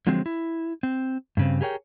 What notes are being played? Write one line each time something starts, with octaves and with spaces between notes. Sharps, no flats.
D3 F3 F#3 G#3 C4
E4
C4
G2 C#3 C4
G4 G#4 A#4 C#5 G5